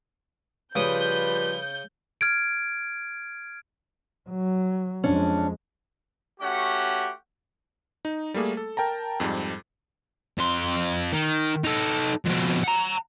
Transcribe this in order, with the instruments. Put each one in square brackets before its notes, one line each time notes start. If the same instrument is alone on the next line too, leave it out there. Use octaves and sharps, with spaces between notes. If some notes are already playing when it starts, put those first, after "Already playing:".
[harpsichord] C#3 D#6 [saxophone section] F3 G3 B4 [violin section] G6
[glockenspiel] F6 G#6 D7
[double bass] F#3
[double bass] F2 G#3 [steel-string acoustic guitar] C#4 D4
[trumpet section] A3 C#4 F#4 G4 F#5
[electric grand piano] D#4
G3 A3 A#3 G#4
A4
A#4 G5 A5 A#5
F2 G#2 G3
[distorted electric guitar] F2 C6
D#3
D#4 A4
F2 B2
F#5 A#5